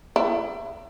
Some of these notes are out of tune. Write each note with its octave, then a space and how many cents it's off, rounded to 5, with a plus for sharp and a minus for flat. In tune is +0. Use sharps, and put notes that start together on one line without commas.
E4 +30